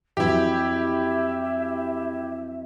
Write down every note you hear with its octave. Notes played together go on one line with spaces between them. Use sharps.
F2 E3 F#3 E4 G4 E5